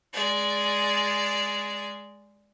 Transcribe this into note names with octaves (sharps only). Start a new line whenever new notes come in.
G#3 D5